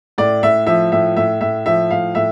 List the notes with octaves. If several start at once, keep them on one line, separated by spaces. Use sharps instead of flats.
A2 D5
A2 E5
F3 E5
A2 E5
A2 E5
A2 E5
F3 E5
A2 F5
A2 E5